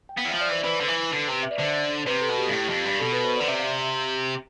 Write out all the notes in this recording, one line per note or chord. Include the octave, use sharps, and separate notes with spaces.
G5
B3 F5
E3
F3 E5
D5
E3 C5
E3 B4
D3
E3
D3
C3
E5
D5
D3 C5
C3 B4
A4
B2
G4
G2
A2
F2
G2
B2 A4
B4
C5
D3 D5
C3 E5
F5